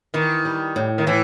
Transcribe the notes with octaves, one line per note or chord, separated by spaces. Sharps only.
D#3 E3
G3
A2
D#3
A2 E3